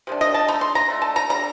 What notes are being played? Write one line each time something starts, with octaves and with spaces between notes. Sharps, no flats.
C3 D#3 D4
D#5
A5
D3 A3 D#4 A#5
C6
A#5
D3 A3 D4
A5
A#5
D3 G3 D4 A#5